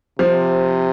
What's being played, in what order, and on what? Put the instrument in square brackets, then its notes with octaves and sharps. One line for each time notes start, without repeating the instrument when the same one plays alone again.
[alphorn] C3 [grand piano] F3